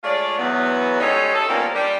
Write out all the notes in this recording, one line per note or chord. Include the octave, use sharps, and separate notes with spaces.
G#3 A3 F4 C#5 D5
E2 F#3 B3
G3 G#3 C#4 D#4 A4 C#5
A4
D#3 F3 G3 A#3 B3 C#4
G3 D4 G4